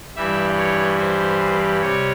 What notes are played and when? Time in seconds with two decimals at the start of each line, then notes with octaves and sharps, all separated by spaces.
0.16 G2 E3 G3 E5
0.57 C#5
0.98 C5
1.81 C3 G3 C#5